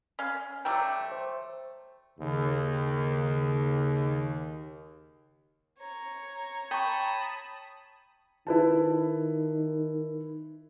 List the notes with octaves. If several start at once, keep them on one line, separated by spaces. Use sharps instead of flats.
C#4 F5
F#3 G3 A3 G5 D6
C5
D#2 C#3
C#5 A#5
G5 A5 B5 C#6 D#6
D#3 E4 B4 A5